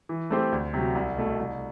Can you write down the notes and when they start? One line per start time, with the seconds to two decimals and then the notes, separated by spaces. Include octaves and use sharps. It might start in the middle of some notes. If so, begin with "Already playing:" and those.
0.09 E3
0.30 A3 C4 G4 C5
0.52 D2
0.74 C3 F#3
0.95 C2
1.17 B2 A3
1.39 C2